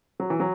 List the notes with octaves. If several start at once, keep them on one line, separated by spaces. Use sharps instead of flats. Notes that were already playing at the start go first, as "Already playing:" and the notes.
F#3
E3
F#3